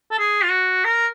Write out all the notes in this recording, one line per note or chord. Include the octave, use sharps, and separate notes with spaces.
A4
G#4
F4
F#4
A#4